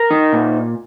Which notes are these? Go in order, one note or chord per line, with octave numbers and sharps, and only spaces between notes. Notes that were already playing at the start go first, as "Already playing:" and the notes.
Already playing: A#4
D#4
A#2